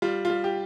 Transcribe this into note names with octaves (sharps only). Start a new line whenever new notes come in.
G3 F4
F4
G3
G4